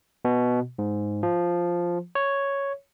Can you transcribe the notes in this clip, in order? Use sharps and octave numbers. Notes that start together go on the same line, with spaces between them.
B2
G#2
F3
C#5